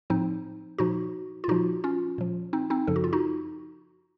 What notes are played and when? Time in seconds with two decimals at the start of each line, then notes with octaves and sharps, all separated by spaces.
0.10 A2 F3 C4 D#4
0.78 A#2 F3 D#4 F#4
1.44 F4
1.48 A#2 F3 D#4 F#4
1.84 C#4 F4
2.18 A#2 F3
2.53 C4 D#4
2.70 C4 D#4
2.87 F#2 C#3 F3 A4
2.96 F#4
3.04 F4
3.13 D#4 F#4